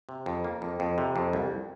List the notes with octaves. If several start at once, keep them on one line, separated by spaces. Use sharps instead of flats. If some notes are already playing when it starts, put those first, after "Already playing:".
C3
F2
A#3
F2
F2
C3
F2
C2